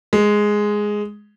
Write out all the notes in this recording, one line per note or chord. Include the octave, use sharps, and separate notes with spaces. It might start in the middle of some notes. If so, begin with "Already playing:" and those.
G#3